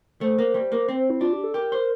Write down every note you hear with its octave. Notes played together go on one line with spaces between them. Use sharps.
A3 C5
A#3
G3
A#3
C4
E4
D4 F4
G4
A4
G4 A#4
C5